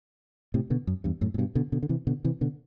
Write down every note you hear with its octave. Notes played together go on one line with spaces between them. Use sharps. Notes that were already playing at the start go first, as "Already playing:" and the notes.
A2 C3
B2 D3
F#2
E2 G2
F#2 A2
A2
G2 B2
B2 D3
B2 D3
D3
C3 E3
B2 D3
C3 E3
B2 D3